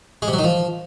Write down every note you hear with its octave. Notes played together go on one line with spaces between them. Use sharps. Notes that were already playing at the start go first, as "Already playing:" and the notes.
G#3
C3
F#3
D#3
F3